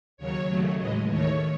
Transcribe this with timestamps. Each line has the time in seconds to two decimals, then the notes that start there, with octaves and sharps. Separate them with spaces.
0.17 D#2 C#3 F#3 C#5
0.47 D#2 C#3 F#3 A3
0.77 A2 E3 G#3 D#5
1.08 D#2 D#3 A3 C#5